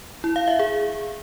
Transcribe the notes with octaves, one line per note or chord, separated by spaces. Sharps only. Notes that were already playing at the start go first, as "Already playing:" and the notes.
E4
F5
E5
G#4